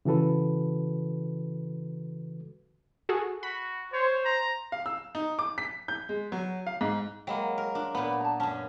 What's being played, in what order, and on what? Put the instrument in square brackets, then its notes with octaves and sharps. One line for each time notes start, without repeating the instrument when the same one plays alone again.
[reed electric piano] C#3 E3 F#4 A4 B4
[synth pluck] F#4 G#4 A4
[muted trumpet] F#4 [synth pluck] B5
[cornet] C5 [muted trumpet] C#5
[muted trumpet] A#5
[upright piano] F5
E6
D#4
D6
B6
G6
G#3
F#3
F5
G#2
[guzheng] F#3 G#3 A#3 [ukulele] G5 B5
[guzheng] A#4
[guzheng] D4 [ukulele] F4
[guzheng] A#2 B3 [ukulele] B5
[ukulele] A5 A#5
[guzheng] F#2 C#4 [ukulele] A5